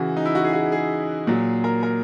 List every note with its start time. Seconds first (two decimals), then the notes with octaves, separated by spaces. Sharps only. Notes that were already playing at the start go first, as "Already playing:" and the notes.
Already playing: C#3 E3 F#4
0.17 D#4
0.25 E4
0.35 F#4
0.44 G#4
0.53 F#4
0.72 G#4
1.27 A#2 F#3
1.64 A#4
1.83 A#4